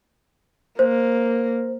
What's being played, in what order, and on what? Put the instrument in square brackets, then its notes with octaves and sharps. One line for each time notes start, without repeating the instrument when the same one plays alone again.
[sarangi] A#3 [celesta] C5